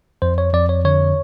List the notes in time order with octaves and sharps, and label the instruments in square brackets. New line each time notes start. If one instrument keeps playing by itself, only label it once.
[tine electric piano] F2 C5
C#5
F2 D5
C#5
D3 C#5